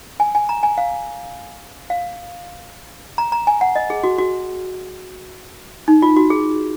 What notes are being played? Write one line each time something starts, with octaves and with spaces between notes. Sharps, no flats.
G#5
G#5
A#5
G#5
F5
F5
A#5
A#5
G#5
F#5
D#5
G#4
F#4
F#4
D#4
F4
F#4
G#4